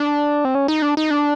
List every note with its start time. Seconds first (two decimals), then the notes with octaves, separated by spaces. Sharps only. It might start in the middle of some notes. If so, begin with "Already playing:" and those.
Already playing: D4
0.45 C4
0.55 C#4
0.68 D#4
0.82 D4
0.97 D#4
1.11 D4